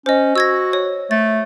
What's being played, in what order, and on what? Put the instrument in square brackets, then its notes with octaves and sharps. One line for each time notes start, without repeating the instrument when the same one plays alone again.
[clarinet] C#4 [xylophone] C5 D#5
[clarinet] F#4 [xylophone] E6 G#6 A#6
[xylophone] C#5
[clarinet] A3 [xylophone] A6